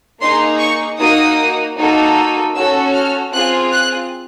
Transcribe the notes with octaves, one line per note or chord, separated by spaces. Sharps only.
A#3 D#4 G#4 C6
C#6
A#3 D#4 F#4 D#6
A#3 D#4 F#4 A4
C#4 F#4 A4 E6
F6
C4 F4 G#4 F#6
F#6